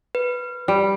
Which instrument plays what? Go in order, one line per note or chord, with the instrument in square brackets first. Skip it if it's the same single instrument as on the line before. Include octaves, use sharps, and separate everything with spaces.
[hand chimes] B4
[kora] G3